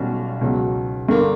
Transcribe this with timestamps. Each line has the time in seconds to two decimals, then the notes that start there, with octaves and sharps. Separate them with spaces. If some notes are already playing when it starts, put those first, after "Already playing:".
Already playing: B1 B2 G3 C#4
0.41 C#2 B2 F#3
1.09 G2 D3 A#3